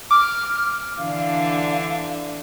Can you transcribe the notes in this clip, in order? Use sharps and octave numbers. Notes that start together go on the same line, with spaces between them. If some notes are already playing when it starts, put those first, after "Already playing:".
D6 F6
D3 E3 D4 F5